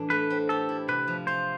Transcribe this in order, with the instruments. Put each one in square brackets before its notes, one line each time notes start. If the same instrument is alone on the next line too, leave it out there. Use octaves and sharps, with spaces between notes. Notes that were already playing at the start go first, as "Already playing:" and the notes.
Already playing: [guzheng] A2 E3 D4
[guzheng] A3 [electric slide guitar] B4
[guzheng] C4
[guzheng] G4 [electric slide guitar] A4
[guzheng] E4
[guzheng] C3 [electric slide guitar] B4
[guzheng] F3
[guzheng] F4 [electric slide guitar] C5